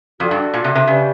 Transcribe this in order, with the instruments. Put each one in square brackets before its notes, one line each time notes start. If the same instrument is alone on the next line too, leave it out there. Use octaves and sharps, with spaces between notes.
[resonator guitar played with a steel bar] F2 [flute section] F#4 A4 D5
[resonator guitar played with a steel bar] G2
A#2
C3
C3
[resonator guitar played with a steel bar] C#3 [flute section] G4 B4 D5 G5